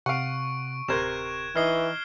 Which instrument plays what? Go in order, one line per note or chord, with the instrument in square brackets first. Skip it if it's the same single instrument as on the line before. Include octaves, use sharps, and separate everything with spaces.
[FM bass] C3 [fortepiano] F5 F#5 [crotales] C#6 D7
[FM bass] D1 [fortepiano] C3 A#4 C5 [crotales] F#6 G#6 E7
[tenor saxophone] E3 [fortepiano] D#4 D#5 [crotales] F6 C7 G7